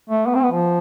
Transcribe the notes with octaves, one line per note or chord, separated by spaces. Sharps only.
A3
B3
C4
B3
F3